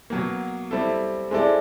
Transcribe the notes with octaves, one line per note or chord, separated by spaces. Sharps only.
B2 F#3 A#3
G3 C4 E4 A4
G#3 C4 E4 A4 D5